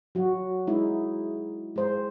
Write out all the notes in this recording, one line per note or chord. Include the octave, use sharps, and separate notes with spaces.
F#3 F#4
G#3 D#4 E4
G#3 C5